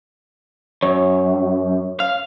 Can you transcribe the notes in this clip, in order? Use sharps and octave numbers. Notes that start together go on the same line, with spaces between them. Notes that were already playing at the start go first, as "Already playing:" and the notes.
F#2 C#5
F5